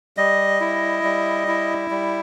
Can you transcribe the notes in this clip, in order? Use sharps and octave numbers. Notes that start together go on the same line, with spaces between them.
G3 D#5
E4
G3
E4
G3